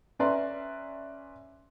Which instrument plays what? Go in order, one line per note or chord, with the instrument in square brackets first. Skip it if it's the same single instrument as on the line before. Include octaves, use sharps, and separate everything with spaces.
[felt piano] C#4 B4 D5 E5 A#5 C6